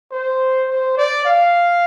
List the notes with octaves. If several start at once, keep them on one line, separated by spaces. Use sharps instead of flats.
C5
C5
D5
F5